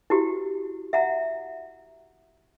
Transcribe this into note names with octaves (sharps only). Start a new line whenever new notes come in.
E4 F#4 G4
E5 F#5 A#5